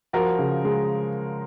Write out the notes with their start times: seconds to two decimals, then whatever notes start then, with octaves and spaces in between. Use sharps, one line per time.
0.13 F3 F#4 A#4
0.39 C#3
0.65 G#3